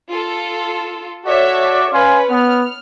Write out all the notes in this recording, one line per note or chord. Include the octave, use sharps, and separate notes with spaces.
F4 A4
F#4 A4 C#5 D5 E5
C#4 B4 F5 G#5 C6
B3 F6